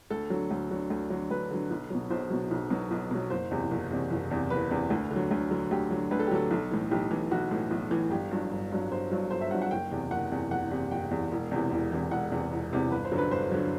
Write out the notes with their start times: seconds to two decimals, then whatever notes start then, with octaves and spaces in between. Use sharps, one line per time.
0.10 D2 A4
0.30 D3 F#3
0.51 D2
0.71 D3 F#3
0.90 D2
1.10 D3 F#3
1.30 D2 B4
1.51 D3 F#3
1.70 B1
1.90 B2 F#3
2.10 B1 C5
2.30 B2 F#3
2.51 B1
2.70 B2 F#3
2.91 B1
3.11 B2 F#3
3.30 F#1 C5
3.51 E2 C3
3.71 F#1
3.91 E2 C3
4.10 F#1
4.31 E2 C3
4.50 F#1 B4
4.71 E2 C3
4.90 D2
5.11 D3
5.16 F#3
5.31 D2
5.51 D3 F#3
5.71 D2 G4
5.91 D3 F#3
6.11 D2 B4
6.19 A4
6.27 G4
6.31 D3 F#3 A4
6.51 B1
6.71 A2 E3
6.91 B1 G4
7.11 A2 E3
7.31 B1 F#4
7.51 A2 E3
7.71 B1
7.91 A2 E3
8.11 G1 G4
8.31 G2 F#3
8.51 G1
8.71 G2 F#3
8.91 G1 C5
9.11 G2 F#3
9.31 G1 C5
9.41 E5
9.51 G2 F#3 F#5
9.62 F#5
9.71 F#1 G5
9.91 E2 C3
10.11 F#1 F#5
10.31 E2 C3
10.51 F#1 F#5
10.71 E2 C3
10.91 F#1 G5
11.11 E2 C3
11.32 E1
11.51 E2 C3 E3
11.71 E1
11.92 E2 C3 E3
12.11 E1 F#5
12.32 E2 C3 E3
12.51 E1
12.71 E2 C3 E3
12.91 G1 B4
13.05 C5
13.12 F#2 D3 F#3
13.18 B4
13.31 G1 C5
13.51 D3 F#3